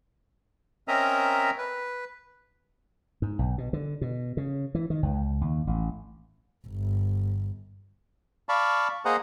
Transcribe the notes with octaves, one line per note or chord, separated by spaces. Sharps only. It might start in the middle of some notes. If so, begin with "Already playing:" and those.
C4 C#4 A#4 D#5 E5 A#5
B4
G#2
B1
B2
D3
B2
C#3
E3
D#3
C#2
D#2
A1
G1
D5 F5 A5 B5 C#6
A#3 G#4 C5 D#5 F#5 A#5